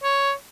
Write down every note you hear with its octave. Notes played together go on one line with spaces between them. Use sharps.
C#5